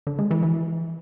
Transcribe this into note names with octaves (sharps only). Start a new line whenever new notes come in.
D3
G#3
E3
E3